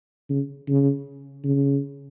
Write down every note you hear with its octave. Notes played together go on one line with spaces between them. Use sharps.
C#3
C#3
C#3